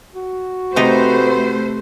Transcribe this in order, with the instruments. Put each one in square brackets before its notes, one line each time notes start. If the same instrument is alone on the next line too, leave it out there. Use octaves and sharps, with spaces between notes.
[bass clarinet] F#4
[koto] C3 D#4 [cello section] A3 A4 C5 [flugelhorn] B4